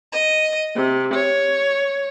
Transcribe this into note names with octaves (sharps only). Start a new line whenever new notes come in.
D#5
C3
C#5